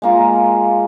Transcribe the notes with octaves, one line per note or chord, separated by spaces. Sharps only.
G#3 A#3 F4